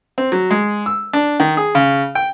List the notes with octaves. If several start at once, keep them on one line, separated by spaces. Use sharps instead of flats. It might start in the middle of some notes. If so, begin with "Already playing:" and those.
C4
F#3
G#3
E6
D4
D#3
G#4
C#3
G5